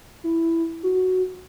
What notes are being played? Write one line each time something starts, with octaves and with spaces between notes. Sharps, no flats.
E4
F#4